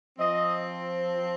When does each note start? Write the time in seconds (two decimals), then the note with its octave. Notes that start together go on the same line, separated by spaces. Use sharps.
0.17 F3 C4 D#5